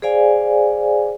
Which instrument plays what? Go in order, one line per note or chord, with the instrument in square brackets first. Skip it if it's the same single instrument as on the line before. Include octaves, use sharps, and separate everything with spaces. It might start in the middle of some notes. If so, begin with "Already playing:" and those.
[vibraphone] G#4 C5 D5 F5 G#5